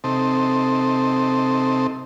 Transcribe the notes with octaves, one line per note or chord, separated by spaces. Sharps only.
C3 C4 D#4 A4